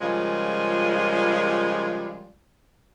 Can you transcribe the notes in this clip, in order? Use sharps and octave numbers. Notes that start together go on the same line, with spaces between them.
C#3 F3 G3 G#3 F4 A#4